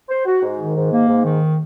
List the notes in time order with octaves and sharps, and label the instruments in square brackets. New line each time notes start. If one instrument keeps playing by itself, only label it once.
[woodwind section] C5
F#4
G#2
D#3
G#2
A#3
G#2
D#3